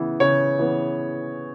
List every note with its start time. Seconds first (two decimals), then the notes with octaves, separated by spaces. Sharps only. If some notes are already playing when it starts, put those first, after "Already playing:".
Already playing: C#3 E3 B3
0.20 C#3 C#5
0.59 E3 B3